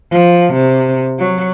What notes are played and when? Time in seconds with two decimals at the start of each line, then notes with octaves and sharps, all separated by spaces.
0.11 F3
0.53 C3
1.19 F#3